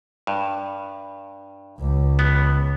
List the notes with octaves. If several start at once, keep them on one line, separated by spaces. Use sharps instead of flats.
G2
C#2 C#3
B3